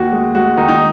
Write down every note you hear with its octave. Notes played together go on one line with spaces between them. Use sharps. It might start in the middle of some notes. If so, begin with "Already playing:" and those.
Already playing: D#2 F#4
G#3
G#3 F#4
D#3 D#4
D#4